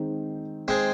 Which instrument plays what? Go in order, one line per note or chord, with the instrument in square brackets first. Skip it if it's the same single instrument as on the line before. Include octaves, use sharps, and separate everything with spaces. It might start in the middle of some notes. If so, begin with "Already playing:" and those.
Already playing: [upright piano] D#3 G#3 C4 D#4
[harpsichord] G#3 C4